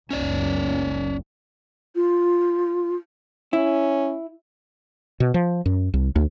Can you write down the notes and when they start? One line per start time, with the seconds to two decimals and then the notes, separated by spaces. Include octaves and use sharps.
0.11 F#1 C#2 C#4 C#5 D5
1.95 F4
3.53 C#4 E4
5.20 B2
5.34 F3
5.66 F#2
5.94 C2
6.16 D2